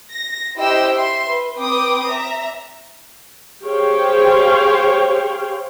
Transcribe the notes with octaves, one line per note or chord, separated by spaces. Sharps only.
A#6
E4 G4 C5 D#5 G5 E6
E5 C6
B4
C4 B4 G5 D6 D#6
E5 A#5
G4 G#4 C5 C#5 F5 G5